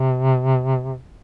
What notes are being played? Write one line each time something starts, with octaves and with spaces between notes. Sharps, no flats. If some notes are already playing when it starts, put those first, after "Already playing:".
Already playing: C3